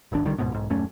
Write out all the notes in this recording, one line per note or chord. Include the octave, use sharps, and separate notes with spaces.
D#1 G#1 D#2 D4
C2 D3 D#3 G3
D2 G#2 B2
B1 G#2
D#1 F#2 A3 C#4